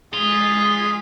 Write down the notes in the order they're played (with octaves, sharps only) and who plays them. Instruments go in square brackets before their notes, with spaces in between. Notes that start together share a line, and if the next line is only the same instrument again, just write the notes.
[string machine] G#3 B6 [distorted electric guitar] F4 [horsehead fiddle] G#4